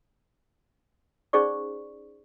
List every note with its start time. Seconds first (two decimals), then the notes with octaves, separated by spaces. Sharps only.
1.33 C#4 D#4 G#4 C5 D5 C#6